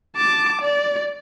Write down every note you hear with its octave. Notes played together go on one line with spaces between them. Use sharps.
A5 D6
D5